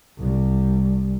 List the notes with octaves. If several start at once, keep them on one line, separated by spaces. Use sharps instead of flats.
C2 G3